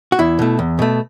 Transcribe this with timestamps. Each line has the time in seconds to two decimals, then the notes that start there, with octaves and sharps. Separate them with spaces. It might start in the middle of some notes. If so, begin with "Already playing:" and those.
0.12 F#4
0.19 E2 E4
0.39 B2 A3
0.59 E2
0.79 B2 A3